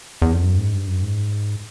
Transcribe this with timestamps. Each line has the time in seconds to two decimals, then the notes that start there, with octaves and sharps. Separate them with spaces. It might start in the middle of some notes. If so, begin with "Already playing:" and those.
0.22 E2
0.33 F2
0.43 F#2
0.57 G#2
0.73 G2
0.87 F#2
1.03 G#2